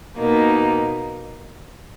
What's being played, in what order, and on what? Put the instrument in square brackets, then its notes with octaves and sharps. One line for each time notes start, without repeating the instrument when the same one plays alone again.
[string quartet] B2 A#3 D#4